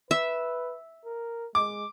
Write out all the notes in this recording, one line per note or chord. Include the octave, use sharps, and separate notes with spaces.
B4 E5
A#4
G#3 D6